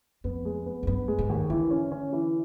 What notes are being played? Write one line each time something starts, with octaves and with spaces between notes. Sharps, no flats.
F2 B3
G#3
B3
F#2
G2 B3
G#3
G#2
D#2
D3 E3
C#4
C#4
E3